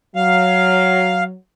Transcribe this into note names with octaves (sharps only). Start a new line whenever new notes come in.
F#3 F5